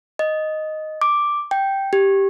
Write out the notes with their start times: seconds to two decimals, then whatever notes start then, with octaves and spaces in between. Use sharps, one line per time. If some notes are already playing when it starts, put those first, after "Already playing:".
0.19 D#5
1.01 D6
1.51 G5
1.93 G4